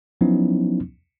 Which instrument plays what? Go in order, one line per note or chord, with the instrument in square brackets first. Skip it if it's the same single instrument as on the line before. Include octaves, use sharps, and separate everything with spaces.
[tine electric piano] F3 F#3 B3 C#4 D#4 E4